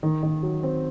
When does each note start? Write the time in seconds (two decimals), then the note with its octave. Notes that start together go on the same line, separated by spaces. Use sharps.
0.03 D#3
0.23 D#3
0.42 F#3
0.63 C4